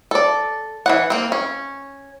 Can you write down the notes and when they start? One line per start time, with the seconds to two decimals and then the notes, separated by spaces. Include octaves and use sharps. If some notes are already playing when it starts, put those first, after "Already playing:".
0.11 A4 D5
0.86 E3 F#3 F#5
1.10 A#3 C4
1.32 C#4